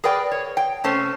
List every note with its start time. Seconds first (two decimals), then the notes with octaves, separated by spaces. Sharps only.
0.04 G#4 A#4 B4 D5 G5
0.31 C#5
0.57 G5
0.84 C3 A3 C#4 A4 C5